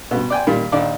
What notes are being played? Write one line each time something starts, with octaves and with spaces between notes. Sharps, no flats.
G2 B2
D5 G5 G#5
A#2 D#3 G3
A#1 D#2 D5